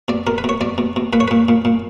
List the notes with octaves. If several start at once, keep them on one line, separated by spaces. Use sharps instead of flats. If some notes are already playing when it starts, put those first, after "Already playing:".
B2 D5
B2 A#4
B4
B2 C#5
B2 D5
B2
B2
A#2 B4
C#5
A#2 B4
A#2
A#2